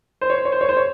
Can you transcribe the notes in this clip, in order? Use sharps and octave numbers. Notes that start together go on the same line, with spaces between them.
C5
C#5
C5
C#5
C5
C#5
C5
C#5